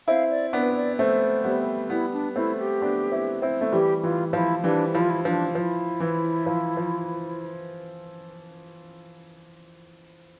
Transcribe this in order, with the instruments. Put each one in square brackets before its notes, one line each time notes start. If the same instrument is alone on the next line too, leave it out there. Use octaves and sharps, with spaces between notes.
[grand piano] C4 E4 [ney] F5
[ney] D5
[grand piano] B3 D4 [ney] B4
[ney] D5
[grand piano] A3 C4 [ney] C5
[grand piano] G3 B3
[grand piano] G3 B3 [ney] E4
[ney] D4
[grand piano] A3 C4 [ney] E4
[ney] G4
[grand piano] B3 D4
C4 E4
C4 E4
A3
[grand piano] E3 G3 [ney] G4
[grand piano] E3 [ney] F4
[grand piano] F3 [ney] E4
[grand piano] E3 G3 [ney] D4
[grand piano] F3 [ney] E4
[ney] F4
E4
[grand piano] F3 [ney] D4
[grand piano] F3 [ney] E4
[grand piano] E3
F3
F3